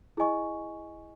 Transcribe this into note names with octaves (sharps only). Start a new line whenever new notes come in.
E4 G#4 D#5 G#5 C#6